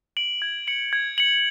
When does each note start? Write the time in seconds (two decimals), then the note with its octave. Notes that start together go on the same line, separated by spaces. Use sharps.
0.17 D7 F#7
0.42 G#6
0.68 C#7 F#7
0.93 G#6
1.18 C#7 F#7